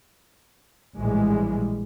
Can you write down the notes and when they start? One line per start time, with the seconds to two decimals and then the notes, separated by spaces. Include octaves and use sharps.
0.96 A#1 A2 E3 G3 G#3